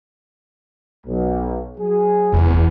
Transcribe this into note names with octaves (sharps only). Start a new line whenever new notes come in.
B1
F#3 G#4
F1 E2